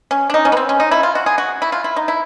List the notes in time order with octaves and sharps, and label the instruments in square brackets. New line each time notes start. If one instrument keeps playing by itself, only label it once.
[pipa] C#4
D4
D#4
C#4
B3
C4
C#4
D#4
E4
F4
F#4
G#4
F#4
E4
F4
E4
D#4
E4